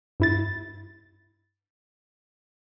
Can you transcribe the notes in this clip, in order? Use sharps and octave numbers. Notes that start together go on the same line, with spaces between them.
G2 E4 A6